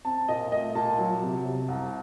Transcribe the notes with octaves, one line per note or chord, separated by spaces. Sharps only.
C4 A5
A#2 D#5
A3 D#5
A#2 A5
F#3
C3
C3
C2